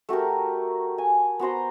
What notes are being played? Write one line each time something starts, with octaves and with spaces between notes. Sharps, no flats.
A3 F#4 G4 A#4
G#5
B3 F#4 C5 A#5